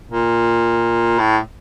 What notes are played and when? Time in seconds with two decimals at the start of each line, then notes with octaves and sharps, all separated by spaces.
0.12 A#2
1.19 A2